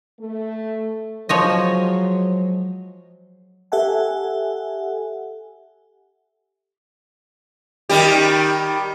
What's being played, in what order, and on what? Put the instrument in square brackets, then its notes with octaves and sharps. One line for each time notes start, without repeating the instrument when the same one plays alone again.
[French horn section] A3
[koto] F3 C#5 D#5 [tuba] F#3 [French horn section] G#3 C5
[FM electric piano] G4 A4 E5 F#5 G#5
[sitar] D#3 G3 G4